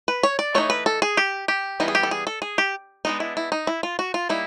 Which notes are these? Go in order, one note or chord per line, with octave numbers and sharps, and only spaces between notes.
B4
C#5
D5
E3 A3 D#4 C#5
B4
A4
G#4
G4
G4
E3 G3 B3 D#4
G#4
G4
A4
G#4
A4
G#4
G4
G#3 B3 D4 D#4
E4
E4
D#4
E4
F4
F#4
F4
G3 A#3 D#4 E4